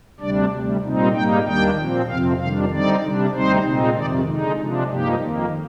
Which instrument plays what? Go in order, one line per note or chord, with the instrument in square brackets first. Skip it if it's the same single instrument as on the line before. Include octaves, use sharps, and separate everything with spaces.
[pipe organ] D2 C3 G3 D4 D5
D2 C3 G3
A#2 G3 C4 D#4
G#2 G3 A#3 D#4 G5
D#2 D#3 G3 A#3 D4 G5
A#2 F3 C4
F2 C3 F3 C4 F5
F2 D#3 G3 D4 F5
D3 G3 C4 D#4 D5
C3 G3 D4
D2 C3 G3 C4 D#4 C5
A#2 G#3 C4 D#4
F2 C3 D#3 D5
D3 G#3 D#4
C3 F3 G#3 D4
G2 F3 A#3 D#4 G4
F2 D#3 A#3